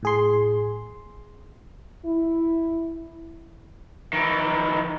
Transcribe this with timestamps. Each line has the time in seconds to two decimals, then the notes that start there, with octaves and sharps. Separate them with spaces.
0.03 A2 G#4 C6
2.05 E4
4.13 D#3 E3